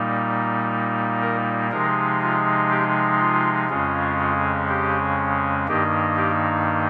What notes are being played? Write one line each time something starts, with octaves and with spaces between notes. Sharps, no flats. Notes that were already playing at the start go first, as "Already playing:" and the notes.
Already playing: A#2 G3 A#3 D#4
A#4
C3 F3 G#3 D#4 A#4
F4
G4
F4
F2 C#3 G#3 C#4 F4
F4
G4
G2 D#3 A#3 D#4 G4
G4